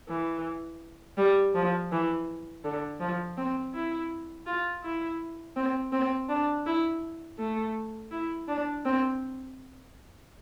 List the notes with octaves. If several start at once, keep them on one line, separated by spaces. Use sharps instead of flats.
E3
G3
F3
E3
D3
F3
C4
E4
F4
E4
C4
C4
D4
E4
A3
E4
D4
C4